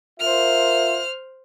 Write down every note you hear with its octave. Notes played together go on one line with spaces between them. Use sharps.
F4 A#4 C5 E5 F6